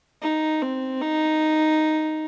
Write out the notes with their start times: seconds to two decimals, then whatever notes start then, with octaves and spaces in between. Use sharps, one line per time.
0.22 D#4
0.62 C4
1.02 D#4